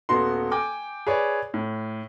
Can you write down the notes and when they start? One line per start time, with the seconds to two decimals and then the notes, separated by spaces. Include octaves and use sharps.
0.09 D#1 B3 F#4 C6
0.51 G5 G#5 D6
1.07 G#4 B4 C#5 D5
1.54 A2